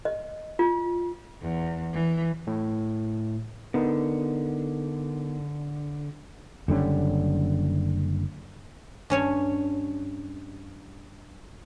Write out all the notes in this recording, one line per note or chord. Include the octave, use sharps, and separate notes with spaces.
D#5
F4
E2
E3
A2
D3 B3 D#4 A#4
F#1 D3 G3 C#4
G2 C#4 C#5